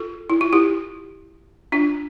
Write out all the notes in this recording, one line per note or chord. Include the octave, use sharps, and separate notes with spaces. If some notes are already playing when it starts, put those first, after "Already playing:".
Already playing: F4 A4
E4
F4
E4 G4
D4 F4